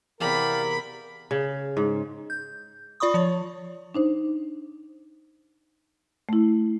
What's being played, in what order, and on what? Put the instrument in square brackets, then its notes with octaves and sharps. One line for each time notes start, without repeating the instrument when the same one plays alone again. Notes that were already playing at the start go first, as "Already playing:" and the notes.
[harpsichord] E2 C3 [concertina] G4 D5 F5 [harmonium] A#4 [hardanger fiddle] B5
[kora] C#3
G#2
[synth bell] G6
F4 D5 B5 C#6 D#6
F3 C#5
[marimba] D4 D#4 C5
A3 E4